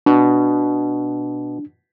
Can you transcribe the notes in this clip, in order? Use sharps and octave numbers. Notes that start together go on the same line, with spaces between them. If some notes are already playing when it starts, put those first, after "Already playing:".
B2 D4